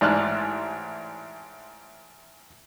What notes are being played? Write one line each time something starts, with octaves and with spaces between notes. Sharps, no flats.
A1 G#2 D5 A5 F6 F#6